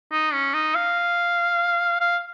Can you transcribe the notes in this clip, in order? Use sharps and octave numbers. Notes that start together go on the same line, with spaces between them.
D#4
C#4
D#4
F5
F5